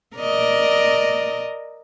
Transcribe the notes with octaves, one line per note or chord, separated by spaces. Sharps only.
A#4 D5 D#5